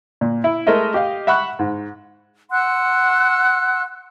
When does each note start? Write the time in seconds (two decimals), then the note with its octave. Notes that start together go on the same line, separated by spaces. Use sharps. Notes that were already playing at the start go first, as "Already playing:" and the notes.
0.21 A#2
0.44 E4
0.67 G#3 A3 A#4 D#5 E5
0.94 G4 D#5 F5
1.27 E5 F#5 B5 C#6 F#6
1.59 G#2
2.51 F#5 C6 E6 F#6